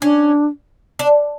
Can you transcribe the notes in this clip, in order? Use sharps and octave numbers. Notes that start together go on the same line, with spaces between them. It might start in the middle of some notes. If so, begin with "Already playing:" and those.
C#4 D4
D4